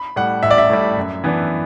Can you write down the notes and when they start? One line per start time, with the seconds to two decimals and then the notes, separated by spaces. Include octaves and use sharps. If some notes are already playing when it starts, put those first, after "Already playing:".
Already playing: B5
0.16 A2 G3 F#5
0.43 A1 E5
0.51 D5
0.58 E5
0.69 A2 G3
0.97 F#2
1.24 E3 B3 D4